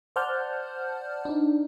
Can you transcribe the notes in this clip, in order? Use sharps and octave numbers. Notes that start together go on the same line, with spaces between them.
C5 D5 F#5 A5 F6 G6
D4 D#4